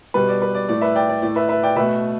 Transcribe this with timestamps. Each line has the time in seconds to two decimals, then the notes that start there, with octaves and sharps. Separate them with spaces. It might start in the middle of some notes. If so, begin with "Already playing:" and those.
0.14 B2 G3 B4
0.28 D5
0.42 B4
0.55 D5
0.69 A2 A3 D5
0.82 B4 E5
0.96 D5 G5
1.09 D5
1.22 A2 A3 D5
1.36 B4 E5
1.49 B4 E5
1.63 D5 G5
1.76 B2 A3 B4 E5